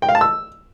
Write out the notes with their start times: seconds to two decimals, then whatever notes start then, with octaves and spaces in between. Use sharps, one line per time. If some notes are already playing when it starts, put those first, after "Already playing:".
0.02 G5
0.09 F5
0.15 A5
0.21 E6